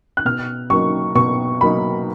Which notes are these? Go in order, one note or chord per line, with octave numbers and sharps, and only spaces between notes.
F#6
B2 F6
F#3 A#3 D#4 C#6
B2 C#6
F#3 A#3 D#4 B5